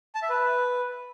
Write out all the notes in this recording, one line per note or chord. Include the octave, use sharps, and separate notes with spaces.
A5
E5
B4